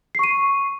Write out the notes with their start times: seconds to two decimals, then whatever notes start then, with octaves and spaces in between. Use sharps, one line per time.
0.15 C7
0.19 C#6
0.24 D#7